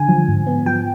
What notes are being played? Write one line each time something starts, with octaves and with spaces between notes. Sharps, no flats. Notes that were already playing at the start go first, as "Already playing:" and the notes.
Already playing: D3 G#5
F3
G#2
B3
F3 G5